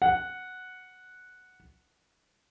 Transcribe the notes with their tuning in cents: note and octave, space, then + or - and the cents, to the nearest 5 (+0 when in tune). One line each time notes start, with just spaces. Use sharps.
F#5 -5